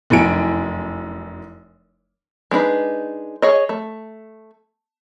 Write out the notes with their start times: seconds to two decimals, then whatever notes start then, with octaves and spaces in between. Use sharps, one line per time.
0.10 F1 F#2 E4 G#5 D7
2.51 G#3 D4 D#4 B4
3.42 G#4 C#5 D#5
3.69 A3